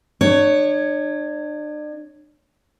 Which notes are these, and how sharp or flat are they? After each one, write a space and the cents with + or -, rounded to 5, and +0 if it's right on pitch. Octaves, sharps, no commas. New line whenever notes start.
D4 +40 C#5 +0